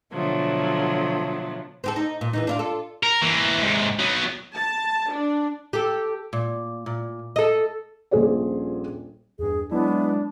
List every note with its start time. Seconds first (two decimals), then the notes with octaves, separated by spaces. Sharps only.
0.12 B2 D3 F3 F#3 A3
1.84 C4 G4 A4
1.96 D#4
2.21 A#2
2.33 E2 E3 D#4
2.47 D4 E4 F4
2.59 F4 A4
3.03 A#4
3.22 E3 A#3
3.62 G#2 C3
3.99 F#3 B3
4.54 A5
5.12 D4
5.73 G4 A4
6.33 A#2
6.86 A#2
7.36 A4 D#5
8.11 D#1 A#1 G#4 C5 D5
9.39 E2 G2 G#4
9.71 F#3 G#3 B3 D4 E4